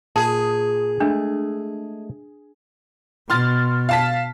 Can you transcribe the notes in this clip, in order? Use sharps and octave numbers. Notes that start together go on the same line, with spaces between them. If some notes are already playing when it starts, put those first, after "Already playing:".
A#2 G#4 A5
G#3 A3 D4
B2 C6 F6 A6
F5 A5 B6